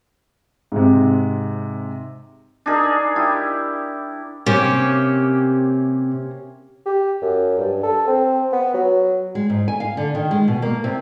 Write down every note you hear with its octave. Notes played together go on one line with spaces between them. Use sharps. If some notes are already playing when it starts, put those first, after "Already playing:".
G#2 C3
D4 D#4 G#4 A#4
E4 G4
C3 A#3 C#4 G4
G4
F#2
G2
A4
C4
B3
F#3
G#3
G#2
G#5
F5
D3
D#3
G#3
B2
A#3
C3